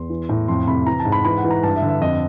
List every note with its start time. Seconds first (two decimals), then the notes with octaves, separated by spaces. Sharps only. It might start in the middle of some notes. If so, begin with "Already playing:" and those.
Already playing: E2 C6
0.10 E3
0.29 A2
0.48 F2 C6
0.67 C3 B5
0.86 E3 A#5
1.00 A5
1.05 G#2
1.12 B5
1.25 E3 B5
1.38 F#5
1.45 E3
1.51 A#5
1.63 G2 A5
1.76 E5
1.82 D3
1.89 E5
2.01 F2 D#5